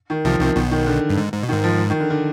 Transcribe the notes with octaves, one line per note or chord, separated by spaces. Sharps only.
D#3
C2 C3 F3
C2 C3 D#3
B1 B2 D#3
D#3
D3
G2
G#2
G#2
B2
D#3
G#2
F3
D#3
D3
D3